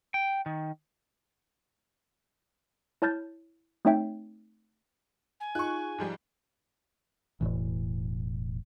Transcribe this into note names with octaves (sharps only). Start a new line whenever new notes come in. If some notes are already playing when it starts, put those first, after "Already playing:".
G5
D#3
E4 C#5 A5 F6 G6 A6
A3 C4 D#4 C#5 E5 G5
G#5
D#4 F4 G#4 C#6 F#6
G#2 F3 G3
E1 B1 A2 E3